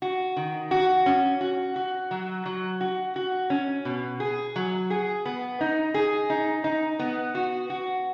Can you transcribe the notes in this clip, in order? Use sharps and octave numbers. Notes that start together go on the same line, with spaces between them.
F#4
D#3
F#4
C#4
F#4
F#4
F#3
F#3
F#4
F#4
C#4
B2
G#4
F#3
G#4
B3
D#4
G#4
D#4
D#4
B3
F#4
F#4